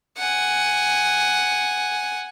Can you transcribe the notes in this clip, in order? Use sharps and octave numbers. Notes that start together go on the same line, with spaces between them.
F#5 G#5